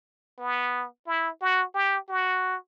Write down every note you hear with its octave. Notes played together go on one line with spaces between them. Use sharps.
B3
E4
F#4
G4
F#4